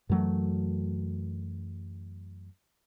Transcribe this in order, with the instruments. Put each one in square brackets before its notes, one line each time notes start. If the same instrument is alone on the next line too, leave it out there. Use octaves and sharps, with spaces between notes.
[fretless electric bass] F#2 E3 F#3 A3